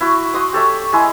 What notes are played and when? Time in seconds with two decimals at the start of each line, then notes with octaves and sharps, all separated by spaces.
0.01 E4 F#4
0.34 F#4 C6 D#6
0.53 G4 A4 C#5 E5
0.93 G#3 E4 G#4